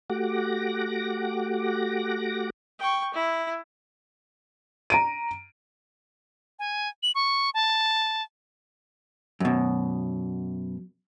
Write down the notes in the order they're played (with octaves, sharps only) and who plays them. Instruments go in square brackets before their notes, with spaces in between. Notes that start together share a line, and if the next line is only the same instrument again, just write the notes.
[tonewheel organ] A3 F#4 G4 F#5 D6 A#6
[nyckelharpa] G5 C#6
E4
[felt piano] A#5 D7 D#7
[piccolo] G#5
F#7
C#6
A5
[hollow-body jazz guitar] F#2 B2